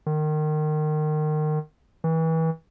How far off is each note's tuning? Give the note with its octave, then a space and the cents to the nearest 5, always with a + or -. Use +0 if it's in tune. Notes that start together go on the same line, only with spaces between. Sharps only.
D#3 -25
E3 -30